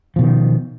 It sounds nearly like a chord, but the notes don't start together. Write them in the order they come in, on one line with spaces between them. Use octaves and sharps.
F3 B2 D#3